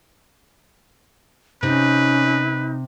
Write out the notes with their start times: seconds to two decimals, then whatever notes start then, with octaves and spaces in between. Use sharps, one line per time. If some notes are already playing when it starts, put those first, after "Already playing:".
1.63 C3 C#4 D#4 B4